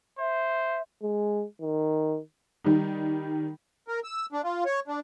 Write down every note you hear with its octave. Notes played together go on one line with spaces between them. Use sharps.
C5 E5
G#3
D#3
D#3 G3 D#4
A#4
E6
D4
F4
C#5
D4